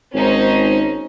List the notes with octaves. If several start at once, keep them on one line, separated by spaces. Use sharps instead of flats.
G#1 C#4 D#4 C5